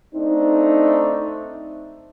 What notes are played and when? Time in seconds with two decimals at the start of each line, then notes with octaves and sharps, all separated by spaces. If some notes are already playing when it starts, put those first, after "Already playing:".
0.15 A3 C4 D4 D#4